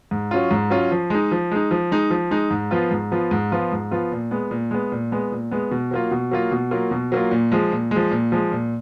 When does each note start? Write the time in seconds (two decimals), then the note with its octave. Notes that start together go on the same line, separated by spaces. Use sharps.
0.11 G#2
0.31 F#3 C#4 F4
0.51 G#2
0.70 F#3 C#4 F4
0.91 F3
1.10 G#3 D#4
1.31 F3
1.51 G#3 D#4
1.71 F3
1.92 G#3 D#4
2.10 F3
2.31 G#3 D#4
2.51 G#2
2.71 F3 B3 F4
2.91 G#2
3.12 F3 B3 F4
3.31 G#2
3.52 F3 B3 F4
3.72 G#2
3.91 F3 B3 F4
4.12 A#2
4.31 G#3 B3
4.51 A#2
4.71 G#3 B3
4.92 A#2
5.12 G#3 B3
5.32 A#2
5.51 G#3 B3
5.71 B2
5.91 F#3 A#3 F4
6.11 B2
6.31 F#3 A#3 F4
6.52 B2
6.71 F#3 A#3 F4
6.91 B2
7.12 F#3 A#3 F4
7.31 A#2
7.52 F3 G#3
7.72 A#2
7.91 F3 G#3
8.11 A#2
8.32 F3 G#3
8.52 A#2